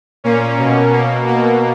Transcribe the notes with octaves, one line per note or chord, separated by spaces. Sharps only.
A#2 A#3 C#4
B2
B2 A#3
B2 A#3